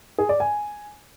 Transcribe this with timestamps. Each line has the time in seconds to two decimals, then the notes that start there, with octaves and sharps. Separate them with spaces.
0.18 G#4
0.29 D5
0.40 G#5